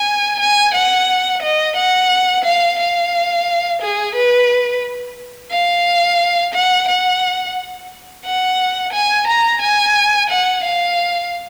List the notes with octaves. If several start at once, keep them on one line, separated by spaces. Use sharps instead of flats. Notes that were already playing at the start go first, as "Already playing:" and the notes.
Already playing: G#5
G#5
F#5
D#5
F#5
F5
F5
G#4
B4
F5
F#5
F#5
F#5
G#5
A#5
G#5
F#5
F5